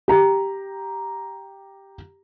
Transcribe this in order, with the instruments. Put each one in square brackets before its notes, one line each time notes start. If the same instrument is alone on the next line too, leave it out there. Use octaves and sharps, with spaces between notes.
[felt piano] G4 A#5